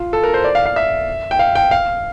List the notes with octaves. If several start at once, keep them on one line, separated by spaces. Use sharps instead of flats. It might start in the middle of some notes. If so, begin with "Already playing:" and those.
Already playing: F4
A4
A#4
C5
D5
F5
F5
E5
G5
F5
G5
F5